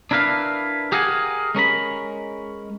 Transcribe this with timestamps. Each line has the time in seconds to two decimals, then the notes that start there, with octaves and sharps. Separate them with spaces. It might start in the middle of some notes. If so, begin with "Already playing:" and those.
0.11 D4 E4 A#4 B4 F5
0.92 G4 G#4 A#4 F5 F#5 G#5
1.55 G#3 C#4 A#4 B5